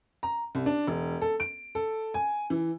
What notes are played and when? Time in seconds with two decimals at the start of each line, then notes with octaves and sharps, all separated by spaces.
0.23 A#5
0.55 C2
0.66 D4
0.87 E1
1.21 A4
1.40 D7
1.75 A4
2.14 G#5
2.50 E3